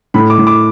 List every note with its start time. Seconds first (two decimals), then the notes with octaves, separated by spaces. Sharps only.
0.14 A2 B5
0.30 D6
0.38 A2
0.47 D6